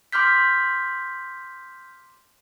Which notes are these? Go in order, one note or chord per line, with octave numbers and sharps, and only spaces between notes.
C6 D6 F6 G6 B6